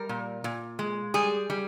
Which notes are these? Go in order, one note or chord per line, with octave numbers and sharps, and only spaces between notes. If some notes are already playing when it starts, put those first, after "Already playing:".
Already playing: G3 A#4
A#2
A#2
G#3
G3 G#4
G3